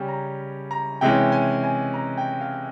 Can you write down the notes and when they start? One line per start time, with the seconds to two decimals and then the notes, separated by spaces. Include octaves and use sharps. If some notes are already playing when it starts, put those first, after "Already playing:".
Already playing: C#3 G3 C#4 G5
0.08 A#5
0.71 A#5
1.01 C3 E3 G#3 C#4 G5
1.32 G#5
1.63 G#5
1.94 A#5
2.18 G5
2.41 F5